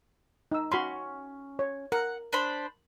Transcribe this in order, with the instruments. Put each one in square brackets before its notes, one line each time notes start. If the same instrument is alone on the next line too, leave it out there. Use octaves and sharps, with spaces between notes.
[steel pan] D#4 E6
[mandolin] C#4 [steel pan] F#4 B5 C6
[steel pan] C#5
[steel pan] A#4 [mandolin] F#5
[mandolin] D4 C5 B5